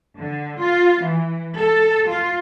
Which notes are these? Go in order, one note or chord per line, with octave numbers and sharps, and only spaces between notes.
D3
F4
E3
A4
F4